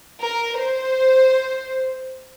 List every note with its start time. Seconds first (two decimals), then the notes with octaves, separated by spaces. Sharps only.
0.21 A#4
0.58 C5